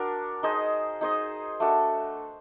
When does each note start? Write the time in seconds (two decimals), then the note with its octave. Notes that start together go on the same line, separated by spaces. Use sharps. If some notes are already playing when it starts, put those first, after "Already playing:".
Already playing: D4 F#4 A#4
0.43 D#4 G#4 C5 D#5
1.01 D#4 G#4 C5 D#5
1.60 A3 D4 F#4 A4